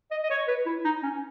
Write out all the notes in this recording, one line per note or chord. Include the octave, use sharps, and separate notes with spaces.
D#5
D#5
C#5
B4
E4
D#4
C#4